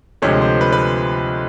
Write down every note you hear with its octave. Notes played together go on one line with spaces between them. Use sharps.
D2 C3 F3 G#3 C#5
C5
B4
B4